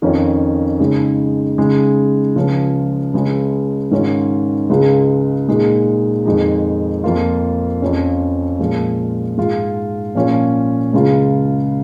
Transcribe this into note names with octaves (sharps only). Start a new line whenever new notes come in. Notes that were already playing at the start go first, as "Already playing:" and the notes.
F2 D#3 C#4 F4
C#3 G#3 D#4
C#3 G#3 D#4
C#2 C#3 F3 C#4
C#2 C#3 G#3 C#4
G#2 D#3 C#4 F4
C#2 C#3 G#3 F4
A#2 G#3 D#4
F2 D#3 G#3 D#4
F2 F3 A#3 F4
F2 F3 C#4
A#2 F3 G#3
G#2 G#3 F4
A#2 F3 C#4 F4
C#2 C#3 G#3 F4